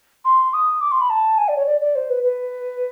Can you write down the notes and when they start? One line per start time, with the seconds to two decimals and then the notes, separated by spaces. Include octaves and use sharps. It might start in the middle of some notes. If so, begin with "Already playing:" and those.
0.25 C6
0.54 D#6
0.81 D6
0.92 C6
1.01 B5
1.10 A5
1.38 G#5
1.48 D5
1.57 C#5
1.66 D5
1.81 D5
1.95 C5
2.10 B4
2.23 B4